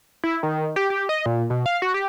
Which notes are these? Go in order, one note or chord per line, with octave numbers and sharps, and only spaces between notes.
E4
D#3
G4
G4
D#5
A#2
B2
F5
F#4
G4